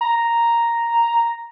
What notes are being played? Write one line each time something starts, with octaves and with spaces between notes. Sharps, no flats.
A#5